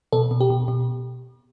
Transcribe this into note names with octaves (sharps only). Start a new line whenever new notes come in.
B2 A4
B2
G4
B2
B2